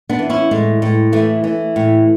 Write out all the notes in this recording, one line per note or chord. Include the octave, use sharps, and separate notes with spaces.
B3 D4
E3
C#4 E4
A2 G#3
A2
E3 A3
E3
A2